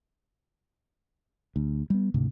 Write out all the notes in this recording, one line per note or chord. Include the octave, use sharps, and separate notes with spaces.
D2
G3 B3
D2 G#2 C3